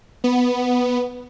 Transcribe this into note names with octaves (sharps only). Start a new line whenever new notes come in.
B3